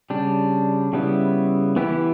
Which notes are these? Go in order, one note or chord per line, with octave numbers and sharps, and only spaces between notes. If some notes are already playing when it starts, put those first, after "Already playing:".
C#3 G3 D4
C#3 G3 B3 E4
E3 B3 E4 G4